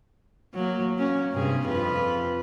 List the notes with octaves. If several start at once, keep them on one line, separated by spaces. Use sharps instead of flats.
F#3 A#3
A#3 C#4
G2 C3 G#4
F2 F4 B4